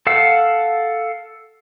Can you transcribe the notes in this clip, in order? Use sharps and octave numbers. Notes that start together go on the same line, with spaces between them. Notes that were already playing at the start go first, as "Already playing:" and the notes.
A4 F5 F#5 E6